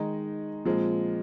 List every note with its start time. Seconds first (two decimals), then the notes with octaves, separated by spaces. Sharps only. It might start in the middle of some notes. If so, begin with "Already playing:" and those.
Already playing: D#3 G#3 D#4
0.65 A#2 F3 G#3 C4